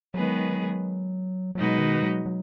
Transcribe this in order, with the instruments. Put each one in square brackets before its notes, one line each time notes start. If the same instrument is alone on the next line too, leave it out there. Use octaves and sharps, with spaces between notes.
[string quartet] D#3 G#3 B3 G#4 B4 [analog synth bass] F#3
[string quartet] B2 G#3 D#4 F#4 B4 [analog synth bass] F#3
[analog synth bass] D#3
F#3
F#3